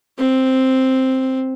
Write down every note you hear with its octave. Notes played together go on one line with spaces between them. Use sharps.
C4